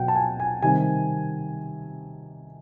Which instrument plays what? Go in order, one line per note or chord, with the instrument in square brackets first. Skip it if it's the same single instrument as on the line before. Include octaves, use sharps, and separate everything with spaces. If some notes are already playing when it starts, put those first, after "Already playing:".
Already playing: [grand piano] B2 F#3 F#5 G5
A5
G#5
G#5
C3 D#3 G3 G#5